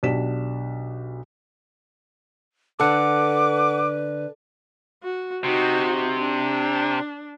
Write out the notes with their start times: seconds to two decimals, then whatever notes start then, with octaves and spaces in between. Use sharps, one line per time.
0.03 B1 D4 G4 B6 E7
2.80 D3 A4 B4 F#5 D6
5.03 F#4
5.44 C3 D#4 F#4
6.19 D4